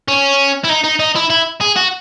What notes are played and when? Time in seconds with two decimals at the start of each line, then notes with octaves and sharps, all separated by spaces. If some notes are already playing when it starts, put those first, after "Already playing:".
0.08 C#4
0.64 E4
0.69 D#4
0.84 D#4
1.00 D#4
1.16 E4
1.30 E4
1.61 G#4
1.76 F#4